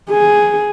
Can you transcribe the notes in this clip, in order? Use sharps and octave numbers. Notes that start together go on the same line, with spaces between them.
G#4